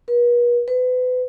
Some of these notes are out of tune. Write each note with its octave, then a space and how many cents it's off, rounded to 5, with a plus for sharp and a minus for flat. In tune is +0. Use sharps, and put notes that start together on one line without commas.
B4 -45
B4 +35